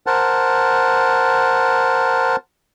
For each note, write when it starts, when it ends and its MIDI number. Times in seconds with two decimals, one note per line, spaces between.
0.07 2.36 70
0.07 2.36 72
0.07 2.36 78
0.07 2.36 81